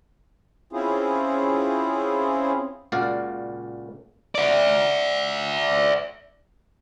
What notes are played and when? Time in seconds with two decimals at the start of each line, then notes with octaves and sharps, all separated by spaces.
0.73 C4 C#4 E4 F4 G#4 C5
2.92 C#2 A#2 F#4 D5 F5
4.35 D5 E5